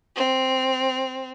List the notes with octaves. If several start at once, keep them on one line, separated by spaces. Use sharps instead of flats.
C4